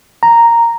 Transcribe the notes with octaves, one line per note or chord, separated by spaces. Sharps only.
A#5